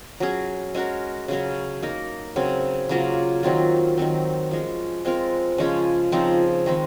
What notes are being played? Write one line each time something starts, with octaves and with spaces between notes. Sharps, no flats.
F#3 C#4 G#4
G#3 C#4 F#4 A#4
C#3 F#3 C#4
A#3 D#4 A#4
C#3 F#3 C4
C#3 F#3 A#3 F4
D#3 F#3 C4 F4
D#3 F#3 C4
F3 G#3 C#4
G#3 C4 F4 A#4
C#3 F3 G#3 C#4
C#3 F3 C4 D#4
D#3 G#3 C4